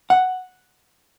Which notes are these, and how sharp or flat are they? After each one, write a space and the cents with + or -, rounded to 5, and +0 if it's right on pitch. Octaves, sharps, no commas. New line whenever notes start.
F#5 +0